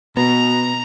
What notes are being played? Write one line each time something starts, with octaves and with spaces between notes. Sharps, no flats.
B2 B3 A#5